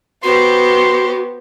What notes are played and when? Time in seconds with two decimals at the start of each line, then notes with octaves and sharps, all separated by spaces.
0.23 B3 F#4 G4 C5 C6